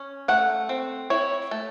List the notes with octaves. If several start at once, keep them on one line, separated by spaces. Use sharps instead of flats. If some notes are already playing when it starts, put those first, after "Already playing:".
Already playing: C#4
A3 F#5
C4
E4 C#5
A3